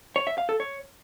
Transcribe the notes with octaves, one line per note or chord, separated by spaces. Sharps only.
C#5
E5
F5
A4
C#5